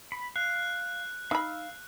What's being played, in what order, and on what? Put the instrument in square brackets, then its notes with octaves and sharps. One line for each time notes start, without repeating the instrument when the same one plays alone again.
[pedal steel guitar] B5
[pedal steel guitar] F5 [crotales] F#6
[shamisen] D#4 B5 [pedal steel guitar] F5 E6 F6